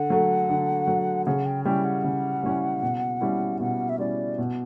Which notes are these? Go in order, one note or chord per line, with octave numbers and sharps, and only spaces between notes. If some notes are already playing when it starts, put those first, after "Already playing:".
Already playing: D3 F#5
F#3 A3
D3
F#3 A3
C#3 F#5
G5
G3 C#4 E4 G5
F#5
C#3
G3 C#4 E4
B2
G3 C#4 E4
B2 F#5
E5
G3 C#4 E4 D5
B2